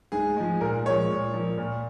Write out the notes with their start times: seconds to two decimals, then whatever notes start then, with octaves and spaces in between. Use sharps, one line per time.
0.12 G#2 G#4
0.36 F3 G#3
0.61 A#2 A#4
0.86 F3 G#3 C#5
1.10 A#2
1.34 F3 A#3
1.58 A#2